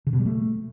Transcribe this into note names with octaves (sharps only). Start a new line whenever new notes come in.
C#3
B2
G3
A3